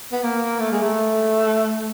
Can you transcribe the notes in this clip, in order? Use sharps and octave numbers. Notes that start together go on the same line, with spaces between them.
B3
A#3
A3
G#3
A3